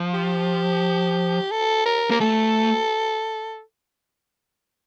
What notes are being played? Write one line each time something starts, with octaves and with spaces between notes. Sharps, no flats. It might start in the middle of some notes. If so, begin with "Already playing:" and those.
Already playing: F3
G4
A4
A#4
A#3 A#4
A3 A4